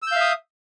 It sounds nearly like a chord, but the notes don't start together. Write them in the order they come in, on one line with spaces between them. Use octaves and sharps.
E6 G6 F5 E5 D#6